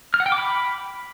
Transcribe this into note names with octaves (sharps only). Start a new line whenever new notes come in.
F6
F#5
G5
D6
B5